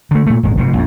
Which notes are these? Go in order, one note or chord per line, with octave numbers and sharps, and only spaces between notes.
D3 A3
A#2 A3
D#1 G#1 G#3
F1 F2 G#2 B2
A#1 F2